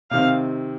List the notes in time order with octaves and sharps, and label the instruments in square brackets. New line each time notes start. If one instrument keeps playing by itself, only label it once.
[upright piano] C3 D#3 C4 [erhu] F5